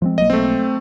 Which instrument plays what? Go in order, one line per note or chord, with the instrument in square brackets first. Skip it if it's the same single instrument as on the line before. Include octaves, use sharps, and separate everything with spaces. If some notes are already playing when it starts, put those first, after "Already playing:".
[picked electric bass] F3 G#3 C4
[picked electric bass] B1 F#3 A#3 [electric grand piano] D#5
[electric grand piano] A3 C4